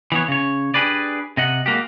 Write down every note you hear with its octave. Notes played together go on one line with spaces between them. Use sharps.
E3 B3 C#5
C#3 C#5
D4 G4 G#4 B4 D5
C3 D#5 F#5
G#3 A#3 F#4 G4